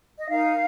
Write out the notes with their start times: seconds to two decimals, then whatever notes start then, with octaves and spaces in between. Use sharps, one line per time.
0.18 D#5
0.28 D#4 A#4 F5